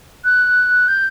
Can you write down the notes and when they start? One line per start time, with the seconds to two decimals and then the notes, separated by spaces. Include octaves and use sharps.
0.25 F#6
0.88 G6